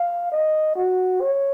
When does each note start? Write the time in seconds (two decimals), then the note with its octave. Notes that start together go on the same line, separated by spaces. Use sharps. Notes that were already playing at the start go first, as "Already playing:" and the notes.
Already playing: F5
0.32 D#5
0.76 F#4
1.21 C#5